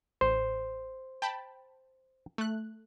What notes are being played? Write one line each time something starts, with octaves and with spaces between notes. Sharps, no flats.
A1 C5
G5 A5 B5
A3 F#6